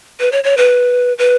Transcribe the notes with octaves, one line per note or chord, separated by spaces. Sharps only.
B4
C#5
C#5
B4
B4